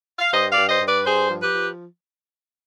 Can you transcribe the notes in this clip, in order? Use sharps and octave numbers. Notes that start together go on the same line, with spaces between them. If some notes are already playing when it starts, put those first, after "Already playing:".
F5
G2 C5 D#5
D5 F5
G2
C5 D#5
G2
B4 D5
G2 G#4 C5
F3
G4 B4
F3